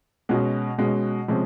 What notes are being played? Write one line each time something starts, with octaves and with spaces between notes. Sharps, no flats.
B2 G#3 C#4 F#4
B2 G#3 C#4 F#4
C3 F3 G#3 C#4